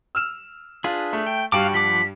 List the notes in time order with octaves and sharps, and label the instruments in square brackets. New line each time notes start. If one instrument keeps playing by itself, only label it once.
[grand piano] E6 F6 E7
[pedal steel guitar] D4 G#4 B4 [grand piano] F4
[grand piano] A3
[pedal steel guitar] G5
[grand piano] G2 G3 [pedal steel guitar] F#4 G5 D6 [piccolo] F5
[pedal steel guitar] F3 F#5 D6 [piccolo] B6